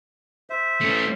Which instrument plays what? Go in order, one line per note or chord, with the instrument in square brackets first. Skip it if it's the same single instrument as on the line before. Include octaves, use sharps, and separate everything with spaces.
[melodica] C5 E5
[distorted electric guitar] A3 C#4